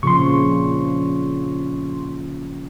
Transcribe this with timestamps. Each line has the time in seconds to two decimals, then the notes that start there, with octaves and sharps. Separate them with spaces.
0.03 A#2 C#3 F3 C6 C#6